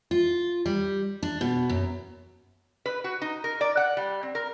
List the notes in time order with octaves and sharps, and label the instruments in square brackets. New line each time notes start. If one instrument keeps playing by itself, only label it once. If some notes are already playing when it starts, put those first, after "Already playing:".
[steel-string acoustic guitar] F4
G3
D4
B2
F#2
[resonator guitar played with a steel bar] B4
F#4
D#4
A#4
D5
F#5
G3
C4
A#4